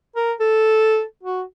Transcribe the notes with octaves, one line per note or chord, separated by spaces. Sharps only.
A#4
A4
F#4